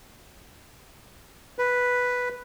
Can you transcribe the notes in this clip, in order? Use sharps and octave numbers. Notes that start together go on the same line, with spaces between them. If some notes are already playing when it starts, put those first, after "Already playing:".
B4